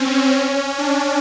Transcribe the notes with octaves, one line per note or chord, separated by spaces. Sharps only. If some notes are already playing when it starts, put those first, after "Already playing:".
Already playing: C4 C#4
D4